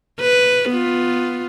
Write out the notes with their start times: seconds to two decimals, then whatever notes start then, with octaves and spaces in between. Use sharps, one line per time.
0.21 B4
0.69 B3 F4